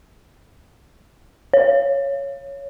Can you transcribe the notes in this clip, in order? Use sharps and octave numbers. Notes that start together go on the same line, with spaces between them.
C#5